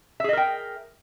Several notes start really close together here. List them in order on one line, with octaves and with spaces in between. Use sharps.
E5 G#4 D#5 A#4 G5